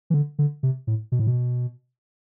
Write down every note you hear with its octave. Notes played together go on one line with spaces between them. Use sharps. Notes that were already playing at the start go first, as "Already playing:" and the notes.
E3
D3
D3
C3
A2
B2
A2
B2